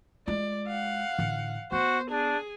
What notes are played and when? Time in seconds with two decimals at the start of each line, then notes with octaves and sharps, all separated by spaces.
0.28 G#3 F4 D5
0.68 F5 F#5
1.19 A1 D3
1.72 B3 F#4 C5
2.11 D4 G#4